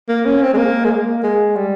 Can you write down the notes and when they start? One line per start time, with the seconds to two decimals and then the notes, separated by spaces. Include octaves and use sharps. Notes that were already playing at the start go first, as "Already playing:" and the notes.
0.09 A#3
0.26 C#4
0.42 C4
0.53 G#3
0.58 A#3
0.85 G#3
0.91 A#3
1.23 G#3
1.56 G3